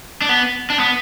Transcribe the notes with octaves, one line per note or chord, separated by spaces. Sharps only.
D4
B3
D4
B3